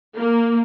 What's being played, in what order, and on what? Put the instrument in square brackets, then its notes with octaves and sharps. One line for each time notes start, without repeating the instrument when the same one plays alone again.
[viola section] A#3